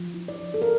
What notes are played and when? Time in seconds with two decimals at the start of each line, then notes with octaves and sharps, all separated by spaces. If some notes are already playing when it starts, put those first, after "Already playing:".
Already playing: F3
0.14 E4
0.28 D5
0.43 F3
0.54 A4
0.62 A#4